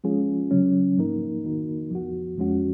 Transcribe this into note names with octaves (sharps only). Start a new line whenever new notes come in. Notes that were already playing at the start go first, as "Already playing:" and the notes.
F3 G#3 C#4 F4 G#4
C#3 F#3 C#4
G#2 F3 A#3 D#4 A#4
D#3 A#3 D#4 F#4 A#4
F3 B3 F#4
F2 F3 G#3 C#4 F#4